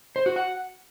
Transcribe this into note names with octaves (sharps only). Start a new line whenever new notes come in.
C5
F#4
F#5